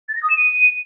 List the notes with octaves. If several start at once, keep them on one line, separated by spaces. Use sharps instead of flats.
A6
A#6
D#6
E7
D#7